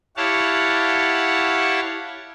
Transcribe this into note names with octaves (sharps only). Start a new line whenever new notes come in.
E4 G4 C#5 F5 F#5 A5